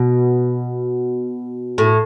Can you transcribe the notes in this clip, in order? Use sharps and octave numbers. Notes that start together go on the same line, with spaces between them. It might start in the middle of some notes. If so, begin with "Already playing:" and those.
Already playing: B2
A2